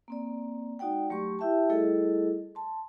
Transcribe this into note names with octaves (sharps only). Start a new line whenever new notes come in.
A#3 C4 D5
G#3 D#4 F#4 D5 F#5 G5
F#3 A3 G4 C6 C#6
E4 G4 E5 G5 A5
G3 A3 E4 G#4 A4 D#5
A5 C6